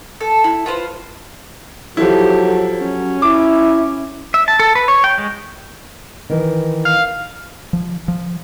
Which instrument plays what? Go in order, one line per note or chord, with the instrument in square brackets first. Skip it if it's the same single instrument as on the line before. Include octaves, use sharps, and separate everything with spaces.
[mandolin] A4
E4
F4 B4 C5
[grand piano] F3 E4 [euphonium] F#3 [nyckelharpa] G4 A4
[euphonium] F#3 [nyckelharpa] C#4
[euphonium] E4 [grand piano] D6
[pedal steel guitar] E5
A5
A4
B4
C#5
G5
G#3
[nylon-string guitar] D#3 E3
[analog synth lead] F5
[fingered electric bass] F3
F3